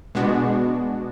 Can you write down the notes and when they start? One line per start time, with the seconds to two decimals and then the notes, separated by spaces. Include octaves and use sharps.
0.15 B2 G#3 B3 D4 F#4